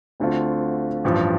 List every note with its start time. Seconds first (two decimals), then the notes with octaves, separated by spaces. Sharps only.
0.20 D2 D3 A3 C4 F4
1.04 A1 G2 F3